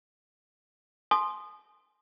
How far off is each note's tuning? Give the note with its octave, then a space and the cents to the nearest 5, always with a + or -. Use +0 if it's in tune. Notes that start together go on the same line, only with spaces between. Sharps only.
G#5 +40 C6 +0 D#6 -20